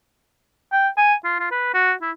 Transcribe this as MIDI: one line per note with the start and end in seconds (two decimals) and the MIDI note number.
0.73 0.88 79
0.97 1.14 80
1.25 1.39 65
1.40 1.51 65
1.51 1.71 71
1.74 1.93 66
2.02 2.11 64